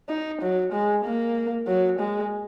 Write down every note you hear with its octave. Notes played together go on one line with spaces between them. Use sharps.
D#4
F#3
G#3
A#3
F#3
G#3